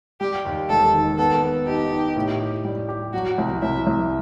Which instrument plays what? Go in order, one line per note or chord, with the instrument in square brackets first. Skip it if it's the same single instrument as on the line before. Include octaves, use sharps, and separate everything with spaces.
[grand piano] G3 [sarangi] G4
[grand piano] D#2
[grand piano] E1 [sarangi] A4
[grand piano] D#3
[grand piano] B3 [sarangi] A4
[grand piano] B3
[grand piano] D#4 [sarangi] G4
[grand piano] D#4
A2
G4
G3
G4
[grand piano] F#3 [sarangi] F#4
[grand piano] C2
[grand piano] C2 [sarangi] E5
[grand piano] C2